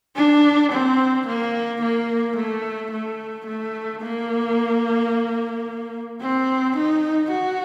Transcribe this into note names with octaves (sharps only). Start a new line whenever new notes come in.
D4
C4
A#3
A#3
A3
A3
A3
A#3
C4
D#4
F#4